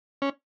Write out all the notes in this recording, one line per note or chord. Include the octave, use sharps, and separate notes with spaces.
C#4